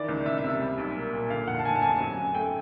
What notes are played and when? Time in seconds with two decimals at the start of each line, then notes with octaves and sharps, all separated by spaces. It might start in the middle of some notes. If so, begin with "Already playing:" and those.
Already playing: D#3 E3 D5
0.08 C#2
0.26 C#2 E5
0.38 E5
0.43 C3
0.49 E5
0.61 G3
0.78 B1
0.96 A#3
1.13 A#2
1.30 D3 F5
1.47 F1 F#5
1.59 A5
1.65 F1 G#5
1.75 A5
1.82 F2 G#5
2.00 F#3
2.18 F#2
2.35 A3 G5